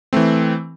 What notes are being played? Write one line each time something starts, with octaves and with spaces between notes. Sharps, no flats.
E3 A3 C4